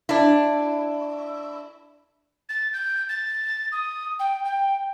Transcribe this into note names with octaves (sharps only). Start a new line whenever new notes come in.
D4 E4
A6
G6
A6
D#6
G5
G5